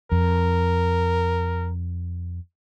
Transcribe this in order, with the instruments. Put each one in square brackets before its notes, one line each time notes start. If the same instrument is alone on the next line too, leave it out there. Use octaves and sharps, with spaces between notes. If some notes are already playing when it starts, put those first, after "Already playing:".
[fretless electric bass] F2 [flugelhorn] A#4